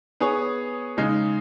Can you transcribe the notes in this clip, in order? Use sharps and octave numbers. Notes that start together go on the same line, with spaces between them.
B3 G#4 C#5
C#3 G#3 D#4 G#4